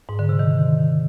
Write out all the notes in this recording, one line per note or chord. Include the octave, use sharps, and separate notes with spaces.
G#2
D3
C3
D#3